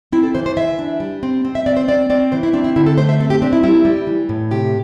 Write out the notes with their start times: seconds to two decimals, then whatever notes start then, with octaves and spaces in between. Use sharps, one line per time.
0.12 C4 E4
0.23 A4
0.35 E3 C5
0.46 C5
0.57 E3 E5
0.79 D4
1.00 G3
1.23 C4
1.45 C4
1.55 E5
1.66 C4 D5
1.77 C5
1.88 C4 D5
2.10 C4 D5
2.32 E3 C5
2.43 E4
2.53 C4 D4
2.64 E4
2.76 D3 E4
2.86 A4
2.98 A3 C5
3.09 E5
3.20 C4 A4
3.30 G4
3.42 C4 D4
3.53 E4
3.63 G3 E4
3.85 G3
4.07 E3
4.29 A2
4.51 C3 G4